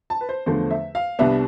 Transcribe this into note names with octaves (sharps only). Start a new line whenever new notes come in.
A5
B4
C5
E2 D3 F3 A3 C5
E5
F5
C2 C3 G3 B3 D4 E5